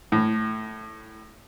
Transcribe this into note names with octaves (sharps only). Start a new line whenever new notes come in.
A2